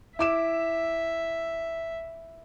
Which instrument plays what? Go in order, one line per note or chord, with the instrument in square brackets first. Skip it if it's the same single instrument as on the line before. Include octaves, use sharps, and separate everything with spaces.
[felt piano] E4 D6 E7 [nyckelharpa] E5